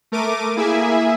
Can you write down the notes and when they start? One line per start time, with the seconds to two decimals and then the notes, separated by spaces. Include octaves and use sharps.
0.12 A3 A#4 D6 D#7
0.56 A#3 E4 G#4 E5 G#5